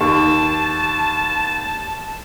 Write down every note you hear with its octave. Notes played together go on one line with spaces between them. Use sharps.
D#2 A5